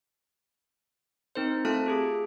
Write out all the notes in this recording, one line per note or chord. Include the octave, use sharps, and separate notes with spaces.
C4 D#4 A#4 C5
A3 C4 F4 A4 A5 F#6
F4 G4 G#4